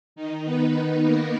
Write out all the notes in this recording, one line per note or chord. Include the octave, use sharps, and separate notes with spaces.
D#3 D#4
B3 B4
A#3 A#4